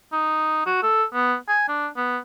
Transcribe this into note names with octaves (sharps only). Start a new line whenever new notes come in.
D#4
F#4
A4
B3
G#5
D4
B3